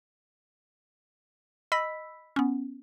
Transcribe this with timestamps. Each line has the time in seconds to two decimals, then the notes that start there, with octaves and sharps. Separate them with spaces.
1.72 D#5 B5 E6 B6
2.36 B3 C#4